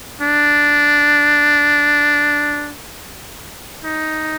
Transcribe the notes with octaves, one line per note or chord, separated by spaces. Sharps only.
D4
D#4